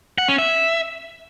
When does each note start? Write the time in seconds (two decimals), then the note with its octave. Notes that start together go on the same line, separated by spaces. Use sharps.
0.18 F#5
0.28 C#4
0.38 E5